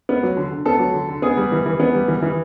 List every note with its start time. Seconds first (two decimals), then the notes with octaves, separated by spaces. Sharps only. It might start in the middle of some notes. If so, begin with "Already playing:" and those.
0.09 B3
0.23 F#3
0.37 D3
0.51 D3
0.66 B3 A4
0.79 F#3
0.94 D3
1.08 D3
1.22 B3 G#4
1.37 G3
1.52 E3
1.66 E3
1.80 B3
1.94 G3
2.08 E3
2.22 E3